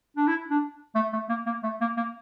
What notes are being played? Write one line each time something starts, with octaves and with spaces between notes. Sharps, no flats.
D4
E4
D4
A3
A3
A#3
A#3
A3
A#3
A#3